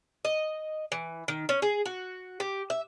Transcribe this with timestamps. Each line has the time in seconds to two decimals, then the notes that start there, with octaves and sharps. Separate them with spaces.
0.25 D#5
0.92 E3
1.28 D#3
1.49 C#4
1.62 G#4
1.85 F#4
2.40 G4
2.70 E5